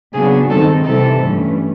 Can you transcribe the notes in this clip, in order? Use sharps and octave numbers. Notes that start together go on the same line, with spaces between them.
C#3 F#3 B3 D4 F#4 G#4
G2 D#3 G#3 C4 D#4 A4
C3 E3 G3 A4
G2 E3 A3 C#4